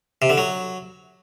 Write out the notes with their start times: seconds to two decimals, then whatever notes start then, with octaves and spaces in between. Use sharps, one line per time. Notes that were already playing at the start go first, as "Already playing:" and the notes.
0.22 C3
0.30 D3
0.38 F#3